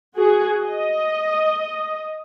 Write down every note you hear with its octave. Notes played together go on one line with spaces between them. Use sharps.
F#4 G#4
D#5